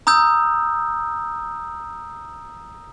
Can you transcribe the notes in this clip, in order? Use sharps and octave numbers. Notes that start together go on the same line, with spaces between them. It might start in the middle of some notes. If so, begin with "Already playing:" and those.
A#5 D#6 E6 G6